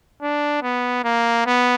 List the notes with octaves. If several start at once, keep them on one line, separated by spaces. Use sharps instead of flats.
D4
B3
A#3
B3